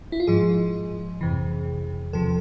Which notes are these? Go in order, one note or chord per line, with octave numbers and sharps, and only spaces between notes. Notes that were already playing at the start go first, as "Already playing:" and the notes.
E4
F4
G#2 F3 G#4
F2 C3 E3
E2 C3 F3 A4